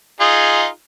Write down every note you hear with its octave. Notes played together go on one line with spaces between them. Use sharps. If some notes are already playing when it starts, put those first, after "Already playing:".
D#4 F4 G#4